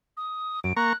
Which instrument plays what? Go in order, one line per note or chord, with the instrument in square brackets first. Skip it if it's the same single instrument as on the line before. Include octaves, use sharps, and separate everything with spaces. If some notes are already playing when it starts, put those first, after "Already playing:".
[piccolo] D#6
[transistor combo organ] F#2 [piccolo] D7
[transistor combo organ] A#3 A#5 C#6 [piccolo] F#6